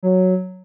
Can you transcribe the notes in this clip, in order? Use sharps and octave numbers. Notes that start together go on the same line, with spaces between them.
F#3